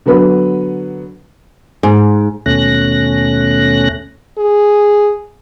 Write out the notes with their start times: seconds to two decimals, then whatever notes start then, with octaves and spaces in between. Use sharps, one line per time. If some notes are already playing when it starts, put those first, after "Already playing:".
0.06 D3 F#3 B3 B4
1.83 G#2
2.46 D#2 B2 A3 C#4 F#6 A#6
4.38 G#4